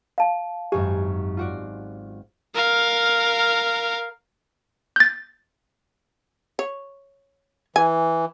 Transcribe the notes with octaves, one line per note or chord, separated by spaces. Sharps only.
F5 A5
G#1 F#2 G4 G#5
F4 F#4 D5
A#4 F5
G6 A6
C#5
E3 G#5